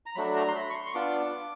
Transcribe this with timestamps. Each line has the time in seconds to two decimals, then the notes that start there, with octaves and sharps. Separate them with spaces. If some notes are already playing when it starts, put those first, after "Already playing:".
0.06 A#5
0.15 F#3 A3 D4 B5
0.36 A#5
0.48 C6
0.55 B5
0.70 C#6
0.75 C6
0.86 C#6
0.94 B3 D4 F4 D6